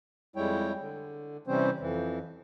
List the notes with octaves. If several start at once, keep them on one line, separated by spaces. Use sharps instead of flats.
F2 G3 G#3 E4 C#5 G5
D3
C3 E3 G3 C4 C#4 C5
F2 E3